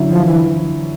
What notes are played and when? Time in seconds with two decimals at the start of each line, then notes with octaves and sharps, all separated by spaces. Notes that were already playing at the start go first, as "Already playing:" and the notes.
Already playing: D3 F#3 C#4 E4
0.09 F3
0.25 E3